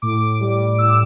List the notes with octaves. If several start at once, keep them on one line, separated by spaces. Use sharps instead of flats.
A2 D6
G3
A2 E6